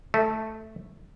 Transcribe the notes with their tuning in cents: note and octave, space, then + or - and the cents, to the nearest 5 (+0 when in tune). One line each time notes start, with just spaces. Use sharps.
A3 +0 E5 -40